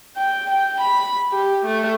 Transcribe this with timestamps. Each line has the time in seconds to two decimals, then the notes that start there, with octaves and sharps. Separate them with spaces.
0.17 G5
0.50 G5
0.81 B5
1.32 G4
1.65 A3